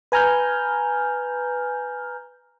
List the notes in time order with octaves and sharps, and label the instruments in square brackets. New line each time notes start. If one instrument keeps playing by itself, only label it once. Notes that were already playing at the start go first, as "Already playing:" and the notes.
[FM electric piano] B4 G#5 A#5 F6 G6